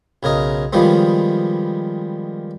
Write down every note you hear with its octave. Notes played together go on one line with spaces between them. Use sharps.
B1 C#3 A#4 D#5
D#3 F3 G3 G#3 B3